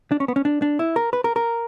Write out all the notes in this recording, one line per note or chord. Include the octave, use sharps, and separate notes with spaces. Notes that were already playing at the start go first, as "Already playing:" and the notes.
D4
C#4
B3
C#4
D4
D4
E4
A#4
B4
A#4
A#4